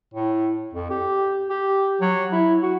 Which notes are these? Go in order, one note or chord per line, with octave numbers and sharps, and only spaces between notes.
A2
F2
G4
G4
F#3
E4
F#4